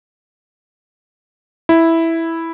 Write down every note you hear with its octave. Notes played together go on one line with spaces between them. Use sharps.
E4